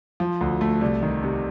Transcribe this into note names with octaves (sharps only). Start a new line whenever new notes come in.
F3
D2
A3
C2
D#3
C3